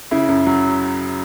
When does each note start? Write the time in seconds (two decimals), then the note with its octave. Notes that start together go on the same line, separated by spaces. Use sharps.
0.11 C#3 E4
0.28 F#2
0.46 F#3